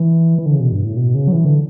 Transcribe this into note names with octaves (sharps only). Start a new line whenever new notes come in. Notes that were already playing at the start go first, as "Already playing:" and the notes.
Already playing: E3
E3
D3
C#3
B2
G2
A2
B2
C#3
F#3
E3
D3